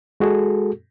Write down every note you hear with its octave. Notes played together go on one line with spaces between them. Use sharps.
G#3 F#4 G#4 A4